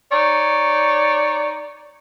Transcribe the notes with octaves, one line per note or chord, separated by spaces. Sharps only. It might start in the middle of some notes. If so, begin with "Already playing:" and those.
D#4 C#5 D5